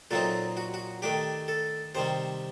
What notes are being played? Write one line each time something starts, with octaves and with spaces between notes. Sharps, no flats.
A#2 F#3 C4 D#4 A4
F#4
F#4
D#3 A3 D4 G4
A4
C3 D#3 G3 C5